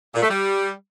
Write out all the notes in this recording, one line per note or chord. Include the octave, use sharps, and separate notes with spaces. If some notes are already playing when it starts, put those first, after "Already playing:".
A#2
A3
G3